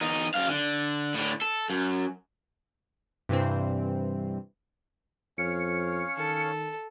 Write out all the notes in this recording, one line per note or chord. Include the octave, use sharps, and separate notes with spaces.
E2 D#4
F#2 F5
D3
A2 D3
A4
F#2
G2 C3 E3 C4
F2 C#4 C#5 F5 C#7
D#3 A4